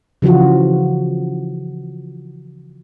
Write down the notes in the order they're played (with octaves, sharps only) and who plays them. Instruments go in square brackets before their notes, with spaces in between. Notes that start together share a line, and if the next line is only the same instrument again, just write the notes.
[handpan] C#3 E3 F3 F4 F#4